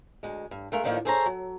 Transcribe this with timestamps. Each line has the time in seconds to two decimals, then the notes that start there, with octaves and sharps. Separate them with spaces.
0.23 D2 G#3
0.51 G2
0.72 G#3 A3 A#4 F5
0.84 A2 D3 D#3 F3 A3 A#3
1.05 G#4 A4 C5 C#5 G5 A#5
1.26 F#3